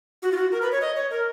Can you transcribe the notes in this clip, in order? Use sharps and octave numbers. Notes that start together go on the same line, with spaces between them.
F#4
F4
F#4
A#4
B4
C#5
D#5
C#5
A#4